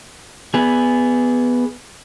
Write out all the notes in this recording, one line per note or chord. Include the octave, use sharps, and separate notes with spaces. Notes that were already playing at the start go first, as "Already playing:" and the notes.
B3 G#4